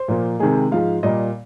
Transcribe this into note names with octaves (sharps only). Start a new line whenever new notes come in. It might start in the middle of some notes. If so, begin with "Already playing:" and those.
Already playing: C5
A#2 F3 A#3
C3 D#3 G#3 G#4
G#2 F3 G#3 F5
A#2 G3 A#3 D#5